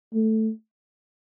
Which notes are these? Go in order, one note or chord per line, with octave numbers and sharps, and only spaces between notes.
A3